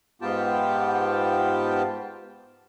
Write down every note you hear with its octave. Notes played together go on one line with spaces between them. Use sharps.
G#2 B3 F4 G4 G5 A5